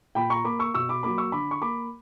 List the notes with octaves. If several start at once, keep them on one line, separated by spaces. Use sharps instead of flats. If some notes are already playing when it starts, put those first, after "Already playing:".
A#2 G5 B5
A#5 C#6
A#3 B5 D6
C#6 E6
B2 C#6 E6
B5 D6
F#3 A#3 B5 D6
C#6 E6
D3 B5 D6
C#6
A#3 B5 D6